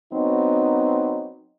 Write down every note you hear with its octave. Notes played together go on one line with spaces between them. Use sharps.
F#3 B3 C4 D#4